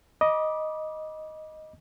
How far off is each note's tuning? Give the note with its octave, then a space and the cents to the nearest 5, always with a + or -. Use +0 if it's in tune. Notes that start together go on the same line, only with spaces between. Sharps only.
D#5 +0 B5 -30 D6 +0